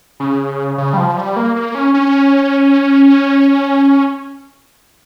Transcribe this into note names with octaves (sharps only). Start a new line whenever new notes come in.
C#3
C#3
G3
F3
G3
A#3
A#3
C#4
C#4